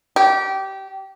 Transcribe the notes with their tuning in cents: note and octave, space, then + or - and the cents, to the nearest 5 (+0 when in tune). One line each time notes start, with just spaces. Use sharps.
G4 -20